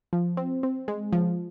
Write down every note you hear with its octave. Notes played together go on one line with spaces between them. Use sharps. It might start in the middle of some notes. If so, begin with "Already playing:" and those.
F3
C4
C4
G#3
F3